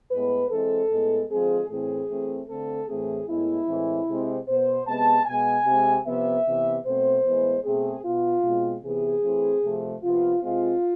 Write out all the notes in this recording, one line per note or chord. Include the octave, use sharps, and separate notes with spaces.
A2 G#3 B3 B4
E3 G#3 C4 A4
A2 G#3 B3
D3 F3 G#3 C4 G#4
A2 E3 A3 C4 G#4
E3 A3 C4
D3 A3 C4 A4
A2 E3 A3 C4 G#4
A2 G#3 B3 E4
A2 E3 G#3 C4
C3 G#3 C4
B2 B3 C5
C3 G#3 B3 A5
B2 G#3 B3 G#5
C3 G#3 C4
C3 F3 B3 E5
C3 E3 B3
B2 A3 C4 C5
A2 E3 G#3 B3
B2 A3 C4 G#4
B2 B3 F4
B2 G#3 C4
C3 E3 B3 G#4
E3 A3 C4
C3 F3 A3
C3 F3 B3 F4
C3 G#3 C4 F4